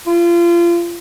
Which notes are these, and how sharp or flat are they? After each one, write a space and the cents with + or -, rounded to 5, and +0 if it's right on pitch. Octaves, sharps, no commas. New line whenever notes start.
F4 -30